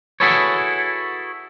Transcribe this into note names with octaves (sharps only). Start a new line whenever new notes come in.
E4 F#4 G#4 A4 B4 C#5